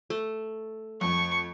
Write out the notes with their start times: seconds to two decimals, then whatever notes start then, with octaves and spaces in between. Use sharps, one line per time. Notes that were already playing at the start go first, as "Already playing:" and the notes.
0.10 A3
1.01 F2 C#6